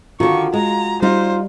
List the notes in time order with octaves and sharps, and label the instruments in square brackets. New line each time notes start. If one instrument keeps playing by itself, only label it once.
[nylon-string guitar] D3 D#3 [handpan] F4 F#4 [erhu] C#6
[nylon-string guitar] G#3 [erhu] A#5
[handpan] G3 [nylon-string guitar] D#4 F4 [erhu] C5